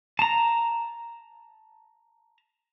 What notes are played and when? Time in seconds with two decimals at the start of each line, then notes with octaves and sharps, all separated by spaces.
0.19 A5 A#5